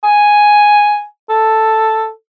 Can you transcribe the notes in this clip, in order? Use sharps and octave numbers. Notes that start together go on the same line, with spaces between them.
G#5
A4